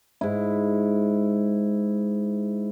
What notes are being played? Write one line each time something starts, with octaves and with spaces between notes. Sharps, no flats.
G#2 E4